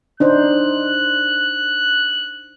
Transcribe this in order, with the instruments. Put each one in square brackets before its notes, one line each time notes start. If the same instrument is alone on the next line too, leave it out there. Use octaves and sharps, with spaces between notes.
[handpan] D4 D#4 C5 [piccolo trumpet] F#6